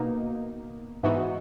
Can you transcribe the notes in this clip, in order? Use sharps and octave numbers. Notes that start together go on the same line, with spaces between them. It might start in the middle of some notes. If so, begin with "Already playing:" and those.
Already playing: B2 A#3 D#4
G#2 E3 B3 D#4 F#4